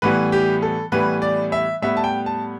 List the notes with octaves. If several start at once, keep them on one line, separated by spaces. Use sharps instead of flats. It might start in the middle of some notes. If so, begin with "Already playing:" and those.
A2 E3 G3 B3 B4
G4
A4
A2 E3 G3 B3 B4
D5
E5
A2 G3 B3 E5
A5
G5
A5